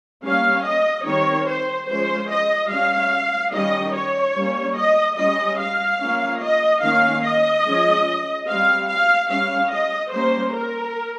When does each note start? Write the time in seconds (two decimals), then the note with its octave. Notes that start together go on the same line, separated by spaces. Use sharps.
0.24 G3 A#3 C#4 F5
0.66 D#5
1.07 D#3 G3 C4 C#5
1.48 C5
1.89 F3 G#3 C#4 C5
2.30 D#5
2.72 G3 C#4 F5
3.54 D#3 G3 C#4 D#5
3.95 C#5
4.37 G3 A#3 C#4
4.77 D#5
5.18 G3 C#4 D#5
5.60 F5
6.01 F3 A#3 C#4
6.43 D#5
6.84 D#3 A#3 C#4 F5
7.24 D#5
7.66 F3 G#3 C#4
8.49 G3 C4 F5
8.89 F5
9.31 G3 C#4 F5
9.72 D#5
10.13 G3 A#3 C#4 C5
10.54 A#4